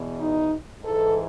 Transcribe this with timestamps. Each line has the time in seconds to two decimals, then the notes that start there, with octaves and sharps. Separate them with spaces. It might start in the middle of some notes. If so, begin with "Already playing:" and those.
Already playing: E2 B2
0.20 D#4
0.82 G#2 E3 A4